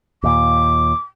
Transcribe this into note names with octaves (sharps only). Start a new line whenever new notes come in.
D#2 A#2 D6